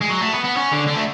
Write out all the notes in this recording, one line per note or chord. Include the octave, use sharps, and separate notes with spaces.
G#3
F#3
A3
B3
B3
C#4
D3
D3
A3